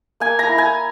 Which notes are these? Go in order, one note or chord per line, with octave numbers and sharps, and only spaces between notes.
A#3 G#5
A#5
E4
G#5